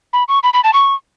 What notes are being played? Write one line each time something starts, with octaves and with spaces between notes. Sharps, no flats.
B5
C#6
B5
B5
A5
C#6